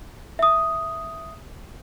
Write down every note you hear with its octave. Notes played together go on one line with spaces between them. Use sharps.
E5 D#6